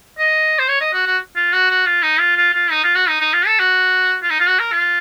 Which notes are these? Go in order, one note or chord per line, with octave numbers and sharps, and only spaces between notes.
D#5
C5
C#5
D#5
F#4
F#4
F4
F#4
F#4
F4
D#4
F4
F4
F4
D#4
F4
F#4
D#4
D#4
F4
A4
F#4
F4
D#4
F4
F#4
A#4
F4